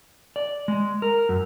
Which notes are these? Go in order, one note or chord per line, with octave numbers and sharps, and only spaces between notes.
D5
G#3
A#4
F#2